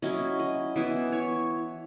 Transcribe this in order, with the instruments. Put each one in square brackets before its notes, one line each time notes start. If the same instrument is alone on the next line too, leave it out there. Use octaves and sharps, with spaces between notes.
[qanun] F#3 C#4 E4 D#5
D#5
E3 B3 E4 E5
C#5